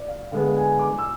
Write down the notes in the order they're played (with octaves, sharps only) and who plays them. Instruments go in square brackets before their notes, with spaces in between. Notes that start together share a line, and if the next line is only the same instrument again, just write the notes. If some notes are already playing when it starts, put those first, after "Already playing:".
Already playing: [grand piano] D5
F5
[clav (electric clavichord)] D3 G#3 B3 [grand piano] F5
[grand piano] G#5
D6
E6